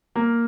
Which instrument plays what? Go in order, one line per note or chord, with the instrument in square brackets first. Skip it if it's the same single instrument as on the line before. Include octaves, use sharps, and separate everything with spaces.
[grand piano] A#3